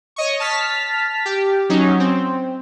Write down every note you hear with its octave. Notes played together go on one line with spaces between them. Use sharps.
C#5 D#5 C#6
A5 F6 B6
G4
F#3 C#4 D#4
C4